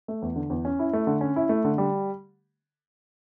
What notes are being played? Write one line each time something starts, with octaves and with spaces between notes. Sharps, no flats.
A3
E2
D3
E2
C#4
E4
A3
D3
C#4
E4
A3
D3
G3